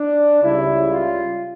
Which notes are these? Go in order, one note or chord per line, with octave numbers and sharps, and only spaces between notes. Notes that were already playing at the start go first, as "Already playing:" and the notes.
Already playing: D4
C#2 C#3 G3 E4
F4